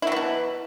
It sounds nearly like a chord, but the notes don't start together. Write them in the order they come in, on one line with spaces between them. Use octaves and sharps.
E4 F#3 E3 B2